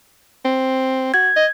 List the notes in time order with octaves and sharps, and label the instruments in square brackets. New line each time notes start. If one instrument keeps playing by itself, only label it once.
[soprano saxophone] C4
[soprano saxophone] F#4 [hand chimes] G#6
[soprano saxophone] D#5